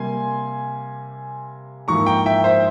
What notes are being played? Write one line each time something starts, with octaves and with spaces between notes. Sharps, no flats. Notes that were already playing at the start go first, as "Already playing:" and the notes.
Already playing: C3 G3 A#3 G#5 C6
G#2 F3 A#3 E4 A#5 C#6
G5 A#5
E5 G5
C5 E5